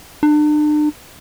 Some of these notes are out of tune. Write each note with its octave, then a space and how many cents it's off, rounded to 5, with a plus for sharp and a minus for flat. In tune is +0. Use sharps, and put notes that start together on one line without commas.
D4 +40